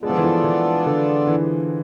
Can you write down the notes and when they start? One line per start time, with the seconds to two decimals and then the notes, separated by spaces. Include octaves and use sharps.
0.02 G#3 B3 D4 F4 A4 D5
0.09 F3
0.18 E3
0.24 F3
0.44 E3
0.86 D3
1.27 E3